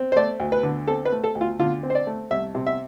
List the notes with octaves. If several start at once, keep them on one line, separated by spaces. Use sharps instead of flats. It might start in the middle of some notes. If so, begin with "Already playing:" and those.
Already playing: C4
C5
A3 D5
D2
B4
D3
C4 A4
B4
A3
A4
D2
F4
D3 F4
C4
C5
D5
A3
C2 E5
C3
E5